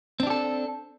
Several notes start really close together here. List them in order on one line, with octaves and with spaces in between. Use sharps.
C4 D4 G4 A4